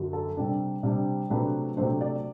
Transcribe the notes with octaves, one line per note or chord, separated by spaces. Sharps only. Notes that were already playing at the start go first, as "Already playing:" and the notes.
Already playing: F#2 D3 F#3
A4
C3 G3 D4
C3 G3 D4
C3 F#3 A3 D4 B4
C3 F#3 A3 D4 C5
D5